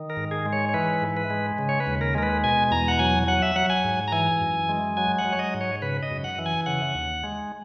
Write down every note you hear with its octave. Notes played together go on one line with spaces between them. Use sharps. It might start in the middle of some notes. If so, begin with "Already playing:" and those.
Already playing: D#3
A#4
G#2
G#4
G#3
C#5
C#5
E3 B4
G#2
B4
G#3
C#3
C#5
B4
D#2
A#4
G#3 A#4
B4
B2 G#5
E2 A#5
F#5
F#3 G#5
F#3 F#5
E5
F#3 F#5
G#5
G#2
A#5
E3 G#5
F#2
G#3
F#3 G#5
F#5
F#3
C#5
D#5
G#2
C#5
C#3 B4
D#5
F#2
F#5
E3
G#5
C#3 F#5
D#2
G#3